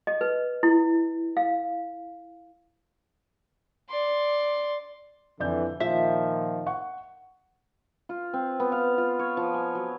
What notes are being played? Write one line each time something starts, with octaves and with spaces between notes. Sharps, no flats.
D#5
B4
E4
F5
D5 C6
F2 D3 E3 D5 G6
A#2 D#3 F3 F4 E5
F#5 C#6
F4
C4
B3
F5
F4
C#5
F3
G#5
F#3